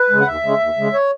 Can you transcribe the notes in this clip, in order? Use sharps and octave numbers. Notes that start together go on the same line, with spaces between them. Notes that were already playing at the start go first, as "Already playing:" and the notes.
Already playing: B4
C#3 G#3
F#5
D#2 E5
C#3 G#3
D#2
C#3 G#3
C#5